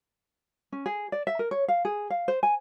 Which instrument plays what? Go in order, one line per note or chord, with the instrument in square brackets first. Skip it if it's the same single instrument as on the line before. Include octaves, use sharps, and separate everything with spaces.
[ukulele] C#4
G#4
D5
E5
A#4
C#5
F5
G#4
F5
C5
G#5